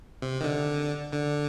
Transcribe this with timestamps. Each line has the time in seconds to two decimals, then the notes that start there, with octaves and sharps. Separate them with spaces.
0.22 C3
0.41 D#3
0.44 D3
1.12 D3